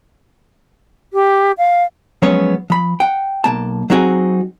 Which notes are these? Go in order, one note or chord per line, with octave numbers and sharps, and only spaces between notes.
G4
F5
F3 F#3 G#3 B3 C#4 C#5
F3 B5
F#5 G5
B1 A#3 A5
F#3 C4 D#4 F#4 G#4